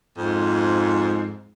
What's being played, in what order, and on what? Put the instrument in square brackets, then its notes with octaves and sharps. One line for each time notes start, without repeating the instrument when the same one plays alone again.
[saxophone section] F2 G#2